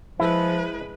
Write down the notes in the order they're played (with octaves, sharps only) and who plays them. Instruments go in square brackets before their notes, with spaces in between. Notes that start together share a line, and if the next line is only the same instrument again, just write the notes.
[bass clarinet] F3 [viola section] G#3 B4 [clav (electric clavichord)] E4